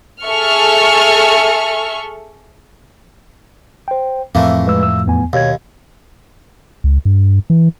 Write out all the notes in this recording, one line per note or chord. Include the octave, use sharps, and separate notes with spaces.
G#4 A4 E5 C#6 F6
C5 G5
F2 A2 E3 F3 A3 A#3 C4
G#3 B4 E6
E6
E2 B3 G#5
D#2 B2 C#5 G#6
C#2
G2
E3